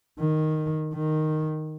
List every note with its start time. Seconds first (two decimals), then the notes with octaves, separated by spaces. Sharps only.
0.20 D#3
0.94 D#3